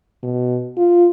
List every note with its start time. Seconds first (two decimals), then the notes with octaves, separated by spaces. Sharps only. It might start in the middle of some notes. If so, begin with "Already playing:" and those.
0.23 B2
0.77 F4